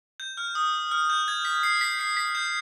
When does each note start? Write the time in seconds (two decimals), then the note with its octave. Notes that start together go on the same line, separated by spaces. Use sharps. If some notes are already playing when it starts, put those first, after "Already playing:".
0.20 G6
0.37 F6
0.55 D#6
0.91 F6
1.10 G6
1.28 G#6
1.45 B6
1.63 C7
1.81 B6
1.99 C7
2.17 B6
2.35 G6